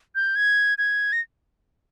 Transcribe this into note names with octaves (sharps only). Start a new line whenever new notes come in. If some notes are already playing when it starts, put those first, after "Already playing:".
G6
G#6
G#6
A#6